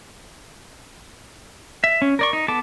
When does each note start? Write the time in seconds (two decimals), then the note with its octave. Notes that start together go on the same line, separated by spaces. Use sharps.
1.84 E5
2.02 C#4
2.19 A#4 D5 C#6
2.33 D#4
2.48 B3 A4 A5 D6